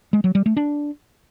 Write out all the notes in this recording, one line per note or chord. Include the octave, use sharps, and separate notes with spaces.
G#3
F#3
G3
A3
D4